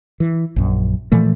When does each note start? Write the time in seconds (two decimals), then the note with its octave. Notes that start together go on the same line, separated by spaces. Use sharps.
0.20 E3
0.56 A#1 F#2
1.12 A#2 E3 F3 A3